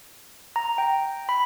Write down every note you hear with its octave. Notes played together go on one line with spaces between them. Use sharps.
A#5
G5
B5